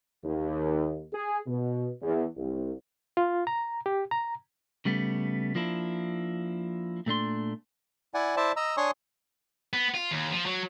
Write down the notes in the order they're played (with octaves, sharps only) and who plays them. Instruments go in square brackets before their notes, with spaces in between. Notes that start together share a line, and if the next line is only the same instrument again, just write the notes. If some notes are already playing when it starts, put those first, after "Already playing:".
[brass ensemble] D#2
G#4
B2
E2
C2
[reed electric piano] F4
A#5
G4
A#5
[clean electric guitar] C#3 G3 A3 B3
F3 A#3 D4 E4
A#2 A3 D4 C6
[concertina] E4 D5 F#5 G#5
E4 C5 D5 E5 A5
D#5 A#5 E6
D4 C#5 G#5 C6 C#6 D#6
[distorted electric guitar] B3
F4
D#2
F3
F#3